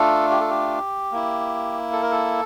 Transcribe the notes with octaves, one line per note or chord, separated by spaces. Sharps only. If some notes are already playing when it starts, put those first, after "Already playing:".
Already playing: A3 D4 F4 A4
G4
A4
G4
A#3 E4
A4
A#4
A4